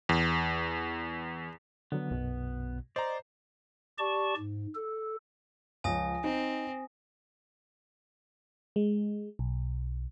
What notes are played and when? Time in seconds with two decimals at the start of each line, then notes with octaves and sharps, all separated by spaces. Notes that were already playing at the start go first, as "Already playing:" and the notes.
0.09 E2
1.92 D3 F#3 B3
2.11 B1 F#2 B2
2.96 C5 D5 D#5 A#5
3.98 G4 D5 A5 C#6
4.37 G#2
4.75 A4
5.84 C#2 F3 G#5 D#6 A#6
6.24 C4 D#4
8.76 G#3
9.39 B1